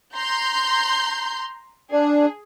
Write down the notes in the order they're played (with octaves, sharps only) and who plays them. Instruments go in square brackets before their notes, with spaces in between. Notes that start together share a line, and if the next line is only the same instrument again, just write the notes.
[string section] A#5 C6 G6
[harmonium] D4 [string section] G#4